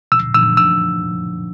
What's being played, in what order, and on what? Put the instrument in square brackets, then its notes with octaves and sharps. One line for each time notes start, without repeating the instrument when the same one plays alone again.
[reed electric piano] E6
E6
E6